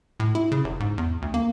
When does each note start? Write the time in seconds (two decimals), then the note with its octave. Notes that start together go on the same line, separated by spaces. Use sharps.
0.20 A2
0.35 E4
0.52 C#3
0.64 F1
0.80 G#2
0.98 E2
1.22 D2
1.34 A#3